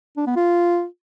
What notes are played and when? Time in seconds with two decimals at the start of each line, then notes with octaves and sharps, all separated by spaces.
0.17 D4
0.27 B3
0.36 F4